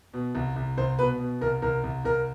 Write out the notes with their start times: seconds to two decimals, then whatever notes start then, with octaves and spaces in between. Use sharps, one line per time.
0.14 B2
0.35 C2
0.56 C2
0.78 C2 C5
0.99 B2 B4
1.20 B2
1.41 C2 A#4
1.62 C2 A#4
1.83 C2
2.05 C2 A#4